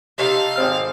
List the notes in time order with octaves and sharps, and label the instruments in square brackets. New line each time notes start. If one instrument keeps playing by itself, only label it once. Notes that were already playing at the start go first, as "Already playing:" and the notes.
[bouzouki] C3 D#4 A4 [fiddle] F5
[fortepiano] G#1 C4 F6